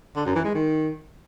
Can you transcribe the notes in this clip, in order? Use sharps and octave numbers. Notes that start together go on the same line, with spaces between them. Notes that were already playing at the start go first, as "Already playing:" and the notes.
D3
F#2
E3
G#3
D#3